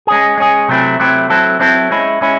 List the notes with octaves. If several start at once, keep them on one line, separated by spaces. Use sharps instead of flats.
G#3 C#4 G#4
G#3 C#4 G#4
C3 F#3 A3 C4 E4
C3 F#3 A3 C4 E4
F#3 C4 E4 A4
F#3 C4 E4 A4
G#3 C#4 E4
G#3 C#4 E4